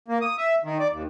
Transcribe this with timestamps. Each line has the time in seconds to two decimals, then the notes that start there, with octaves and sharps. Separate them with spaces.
0.08 A#3
0.21 D#6
0.38 E5
0.64 D#3
0.79 D5
0.92 D#2